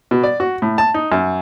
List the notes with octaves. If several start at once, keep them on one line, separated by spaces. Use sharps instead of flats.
B2
D5
F#4
A2
A5
D#4
F#2